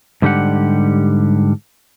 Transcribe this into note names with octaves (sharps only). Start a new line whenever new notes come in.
G#2 D3 G3 B3 G4 F#5